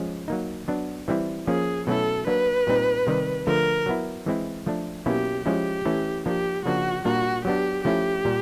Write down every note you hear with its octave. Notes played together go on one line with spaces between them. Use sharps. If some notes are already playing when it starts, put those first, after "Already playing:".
Already playing: F3 G#3 C#4
F#3 A#3 D#4
F#3 B3 D4
E3 G3 C4 E4
F3 A#3 C#4 G#4
B2 F#3 A3 C#4 E4 A4
F#3 A#3 D4 B4
A#2 G3 C4 D#4
C3 D#3 G3
D3 F3 A3 A#4
F#3 B3 E4
E3 G#3 C4 E4
F3 A3 D4
B2 F#3 A#3 C#4 E4 G4
F3 G#3 C#4 E4 G4
E3 A3 C#4 E4
F3 A#3 D4 G4
C#3 F3 A#3 D4 F#4
A#2 G3 A#3 D4 F#4
F#3 B3 D4 G4
F3 A3 C#4 E4 G4
A#2 G3